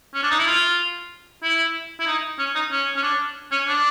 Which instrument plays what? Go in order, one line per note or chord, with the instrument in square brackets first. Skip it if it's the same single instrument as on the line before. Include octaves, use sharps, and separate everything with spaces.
[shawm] C#4
D4
D#4
E4
F4
E4
E4
D#4
C#4
D#4
C#4
C#4
D4
C#4
D4